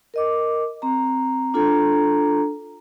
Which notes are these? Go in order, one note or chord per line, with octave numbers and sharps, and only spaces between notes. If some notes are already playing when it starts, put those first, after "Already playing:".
A#4 D#5 D6
C4 A#5
D4 F4 A4 A#5